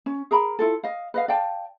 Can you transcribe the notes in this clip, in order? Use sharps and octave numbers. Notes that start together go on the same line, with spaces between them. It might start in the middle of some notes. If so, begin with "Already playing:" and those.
C#4
G#4 A#4 A#5 B5
E4 F4 A4
D#5 F5
B4 D#5 F5
D5 F5 G5 A5